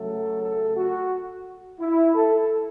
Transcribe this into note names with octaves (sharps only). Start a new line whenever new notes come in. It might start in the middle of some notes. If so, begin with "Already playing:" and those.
Already playing: C#3 F#3 A3 A4
A4
F#4
E4
A4